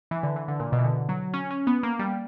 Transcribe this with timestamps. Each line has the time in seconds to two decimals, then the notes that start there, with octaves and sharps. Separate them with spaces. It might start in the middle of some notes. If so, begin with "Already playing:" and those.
0.11 E3
0.23 D3
0.36 E3
0.48 D3
0.60 A#2
0.72 B2
0.79 E3
0.84 D3
1.09 F#3
1.34 C#4
1.51 C#4
1.67 B3
1.83 A#3
1.99 G3